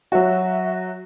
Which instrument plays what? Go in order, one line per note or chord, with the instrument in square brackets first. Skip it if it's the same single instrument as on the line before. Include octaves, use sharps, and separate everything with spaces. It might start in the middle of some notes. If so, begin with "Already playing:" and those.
[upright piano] F#3 F#4 [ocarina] E5